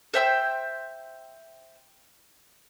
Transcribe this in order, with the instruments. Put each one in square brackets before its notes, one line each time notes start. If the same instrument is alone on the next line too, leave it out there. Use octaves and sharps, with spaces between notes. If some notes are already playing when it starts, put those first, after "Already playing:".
[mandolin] C5 E5 G5 E6